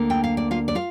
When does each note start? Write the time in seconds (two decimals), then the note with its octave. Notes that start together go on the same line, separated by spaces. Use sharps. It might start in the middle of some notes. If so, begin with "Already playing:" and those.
Already playing: D2 D3 A#3
0.10 G5
0.24 F5
0.37 D5
0.51 F4 F5
0.68 D5
0.75 F4 F5